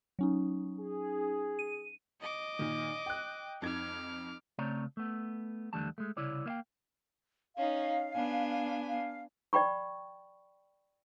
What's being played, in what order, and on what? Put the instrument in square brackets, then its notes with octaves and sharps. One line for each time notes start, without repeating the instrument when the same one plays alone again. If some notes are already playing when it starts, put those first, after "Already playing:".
[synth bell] F#3 C#4 D#4
[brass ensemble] G#4
[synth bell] D#7
[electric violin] D#5 D6
[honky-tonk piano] A#2 D#3
G5 F#6
[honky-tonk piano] F2 D#4 G#6 [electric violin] D6 F6
[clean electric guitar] C#3 A3 C4 C#5 D5 A#5
A3 B3
D#2 D3 E3 G3 A3 A5
G#3 A3
C2 C#3 E4 C#5 D5
A#3 B3 E5 F5 G5
[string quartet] C#4 D#4 [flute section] F5
[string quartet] B3 D4 G#5
[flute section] F5
[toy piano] D5 G5 B5 C#6